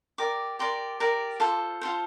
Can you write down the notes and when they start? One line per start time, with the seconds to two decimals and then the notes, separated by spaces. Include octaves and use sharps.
0.18 G4 A#4 D5 D6
0.59 G4 A#4 D5 C6
1.00 G4 A#4 D5
1.40 F4 A4 C5
1.81 F4 A4 C5